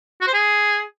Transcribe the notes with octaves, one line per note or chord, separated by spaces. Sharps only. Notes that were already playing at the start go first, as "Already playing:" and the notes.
F#4
C5
G#4